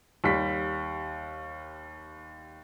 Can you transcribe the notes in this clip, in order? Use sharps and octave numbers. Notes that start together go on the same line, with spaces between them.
D#2 G3 B6